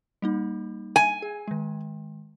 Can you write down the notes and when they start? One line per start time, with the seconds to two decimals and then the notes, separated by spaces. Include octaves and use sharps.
0.22 G3 A#3 D#4
0.96 G#5
1.22 G#4
1.48 D#3 G#3